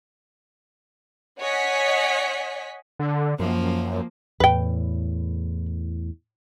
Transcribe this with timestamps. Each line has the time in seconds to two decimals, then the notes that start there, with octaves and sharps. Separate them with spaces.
1.39 C#5 D#5 F#5 G#5 B6 C#7
2.99 D3
3.40 F#2 F3 A#3
4.40 E2 A2 B4 G5